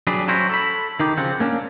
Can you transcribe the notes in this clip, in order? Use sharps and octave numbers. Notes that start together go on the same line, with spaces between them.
F#3 G3 D4 G#4 B4
F#3 C#4 E4 F#4 C5
A4 B5
D#3 D#4 G4
C#3 F3 C4 F#5
A#3 C#4 D4